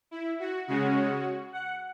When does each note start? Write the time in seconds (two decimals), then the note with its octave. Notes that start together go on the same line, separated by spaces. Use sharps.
0.11 E4
0.40 F#4
0.67 C#3 G#3 C#4 F#4
1.53 F#5